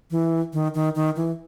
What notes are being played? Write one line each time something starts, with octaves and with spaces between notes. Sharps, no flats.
E3
D#3
D#3
D#3
E3